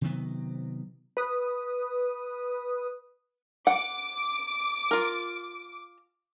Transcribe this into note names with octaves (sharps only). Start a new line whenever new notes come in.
C3 D#3 F#3 B3
B4 D#6
F#5 D6
F4 A#4